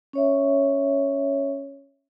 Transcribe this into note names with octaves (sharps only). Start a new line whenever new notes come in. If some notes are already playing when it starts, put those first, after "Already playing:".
C#4 C#5 E5